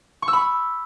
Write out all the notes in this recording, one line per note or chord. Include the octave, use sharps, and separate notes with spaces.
C#6
E6
B5